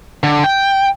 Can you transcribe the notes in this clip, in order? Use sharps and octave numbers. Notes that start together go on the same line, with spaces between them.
D3
G5